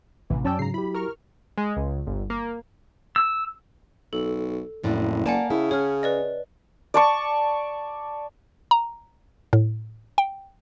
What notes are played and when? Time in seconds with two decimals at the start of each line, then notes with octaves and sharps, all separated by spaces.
0.30 A1 C3 E3
0.44 F#2 F#3 C#4 D5 G5 A5 E6
0.59 G#2 C#3 A#5 C7
0.74 E4 G4 B5
0.94 A#4 C#6 F6
1.58 G#3
1.76 C#2
2.07 G1
2.30 A#3
3.16 E6
4.13 B1 A4
4.84 F#1 F2 A2 D4
5.26 A#3 D5 F#5 G#5 A5
5.50 C#3 E4
5.71 C#4 G#4 C#5 F6
6.03 B4 D5 D#5
6.94 D5 A5 C#6
8.71 A#5
9.53 A2
10.18 G5